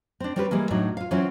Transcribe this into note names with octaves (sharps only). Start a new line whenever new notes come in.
C4 D4
G3 C4 C#4 E4 G4 B4
E3 G3 G#3 A#3
A2 F#3 D4 D#4
F4 F5
E3 F#3 C4 C#4 E4 F4